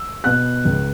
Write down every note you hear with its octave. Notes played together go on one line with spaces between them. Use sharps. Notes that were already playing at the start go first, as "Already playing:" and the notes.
Already playing: E6
B2 F#6
C#2